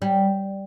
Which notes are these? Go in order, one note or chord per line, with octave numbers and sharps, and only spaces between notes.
G3